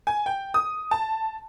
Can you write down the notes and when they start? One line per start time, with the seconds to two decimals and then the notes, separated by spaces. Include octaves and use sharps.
0.07 G#5
0.26 G5
0.54 D#6
0.91 A5